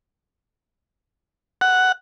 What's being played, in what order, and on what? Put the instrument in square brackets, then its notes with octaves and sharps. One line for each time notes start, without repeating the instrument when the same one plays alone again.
[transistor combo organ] F#5